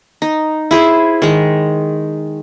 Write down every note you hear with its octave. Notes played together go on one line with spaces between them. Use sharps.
D#4
E4 G#4 C5
D#3 G#3